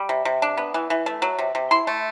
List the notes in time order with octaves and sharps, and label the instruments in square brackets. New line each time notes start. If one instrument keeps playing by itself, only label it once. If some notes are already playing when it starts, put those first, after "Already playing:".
Already playing: [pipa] G3
C3
C3
D4
B3
E3
E3
A3
F#3
C3
C3
E4 C6
A3